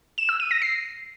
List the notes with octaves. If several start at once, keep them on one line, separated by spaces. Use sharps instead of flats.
E7
E6
D#7
A#6
C7